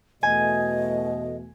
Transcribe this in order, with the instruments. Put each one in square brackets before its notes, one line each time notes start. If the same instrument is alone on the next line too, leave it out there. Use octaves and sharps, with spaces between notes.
[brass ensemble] E2 B2 A3 [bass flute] D#5 [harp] G#5